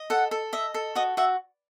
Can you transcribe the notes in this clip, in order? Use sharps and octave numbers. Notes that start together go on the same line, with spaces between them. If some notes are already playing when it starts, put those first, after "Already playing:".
Already playing: D#5
A4 F#5
A4
D#5 E5
A4
F#4 D#5
F#4 E5